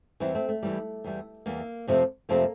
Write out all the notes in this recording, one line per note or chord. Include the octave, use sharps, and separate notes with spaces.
E2 E3 G3 C4 E4
A3 C4
A3
E2 E3 G3
E2 E3 G3
E2 E3 G3 A#3
F2 C3 F3 A3
F2 C3 F3 A3 A#3